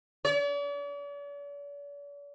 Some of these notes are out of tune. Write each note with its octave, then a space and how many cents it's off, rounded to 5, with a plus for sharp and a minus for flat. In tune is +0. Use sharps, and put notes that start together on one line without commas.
D5 -45